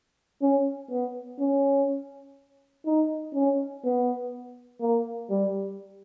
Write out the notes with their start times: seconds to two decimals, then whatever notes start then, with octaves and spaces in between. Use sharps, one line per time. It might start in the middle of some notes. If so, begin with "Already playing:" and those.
0.42 C#4
0.90 B3
1.40 C#4
2.86 D#4
3.35 C#4
3.84 B3
4.81 A#3
5.30 G3